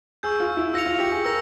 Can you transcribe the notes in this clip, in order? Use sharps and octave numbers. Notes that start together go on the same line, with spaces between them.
G#4 C#6 E6 G6
F4
E4
F4 E6 A#6 C#7 F7
F4
G4
G#4
A#4 E6 A#6